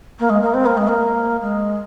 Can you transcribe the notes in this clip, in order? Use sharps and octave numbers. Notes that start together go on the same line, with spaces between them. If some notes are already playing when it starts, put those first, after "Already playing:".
A#3
G#3
A#3
C4
A#3
G#3
A#3
G#3